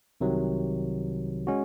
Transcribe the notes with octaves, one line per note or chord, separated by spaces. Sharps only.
C2 C3 D#3 F#3
G#3 C#4 F#4